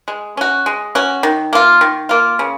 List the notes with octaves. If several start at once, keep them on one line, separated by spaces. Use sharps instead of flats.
G#3
C#4 F#4
G#3
C#4 F#4
D#3
A#3 F4
D#3
A#3 F4
C#3